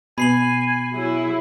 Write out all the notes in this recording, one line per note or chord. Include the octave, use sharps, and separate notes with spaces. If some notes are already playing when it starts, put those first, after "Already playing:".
B2 G#5 B5 C7 F#7
F#3 E4 G#4